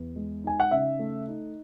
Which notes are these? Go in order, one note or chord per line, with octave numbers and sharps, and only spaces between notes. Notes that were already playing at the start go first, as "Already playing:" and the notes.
Already playing: E2
G#3
D#4 G#5
F#5
C#3 E5
A3
D#4